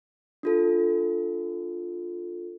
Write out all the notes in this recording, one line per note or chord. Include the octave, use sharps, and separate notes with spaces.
D4 F4 A4